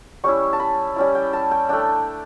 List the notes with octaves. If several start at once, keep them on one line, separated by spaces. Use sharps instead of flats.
G3 C#4 E4 C#6
A5
B5
G3 C#4 E4
G5
A5
G5
A3 D4 G5